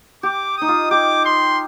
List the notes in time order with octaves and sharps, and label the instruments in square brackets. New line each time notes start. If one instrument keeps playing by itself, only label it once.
[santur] G4 [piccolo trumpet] D6
[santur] D#4 [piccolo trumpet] D#6
[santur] F4
[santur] G4 [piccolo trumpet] D6
[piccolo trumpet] C6